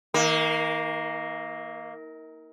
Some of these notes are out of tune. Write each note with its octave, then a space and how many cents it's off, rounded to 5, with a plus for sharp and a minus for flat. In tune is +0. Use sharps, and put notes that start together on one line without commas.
D#3 +40 A#3 +0